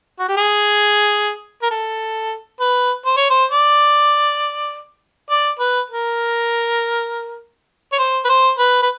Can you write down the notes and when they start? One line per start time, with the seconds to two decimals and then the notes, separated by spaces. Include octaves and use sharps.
0.20 F#4
0.29 G4
0.37 G#4
1.62 A#4
1.71 A4
2.60 B4
3.06 C5
3.17 C#5
3.30 C5
3.51 D5
5.30 D5
5.59 B4
5.90 A#4
7.93 C#5
7.99 C5
8.25 B4
8.29 C5
8.59 B4
8.83 B4